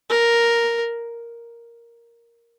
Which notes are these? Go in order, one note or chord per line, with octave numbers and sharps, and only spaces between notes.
A#4